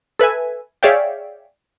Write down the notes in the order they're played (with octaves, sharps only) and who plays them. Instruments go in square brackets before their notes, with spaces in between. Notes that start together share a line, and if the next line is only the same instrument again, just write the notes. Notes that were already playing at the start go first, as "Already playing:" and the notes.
[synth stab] A4 B4 E5 G#5
G#4 C#5 D5 E5 F5 G5